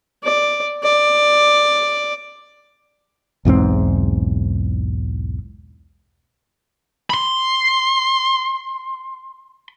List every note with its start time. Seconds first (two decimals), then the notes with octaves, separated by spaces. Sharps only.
0.24 D5
0.83 D5
3.45 B1 E2 G#2 C4
7.10 B5 C6